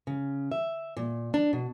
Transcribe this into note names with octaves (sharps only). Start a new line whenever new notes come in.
C#3
E5
A#2
D4
B2